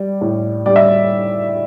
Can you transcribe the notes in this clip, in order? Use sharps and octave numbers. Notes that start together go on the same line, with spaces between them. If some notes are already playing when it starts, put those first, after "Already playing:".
Already playing: G3 D5
A2
G3 D5
E5